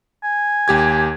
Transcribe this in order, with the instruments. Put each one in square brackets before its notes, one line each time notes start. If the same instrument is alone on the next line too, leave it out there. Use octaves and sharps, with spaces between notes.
[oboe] G#5
[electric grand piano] D#2 G4 G#6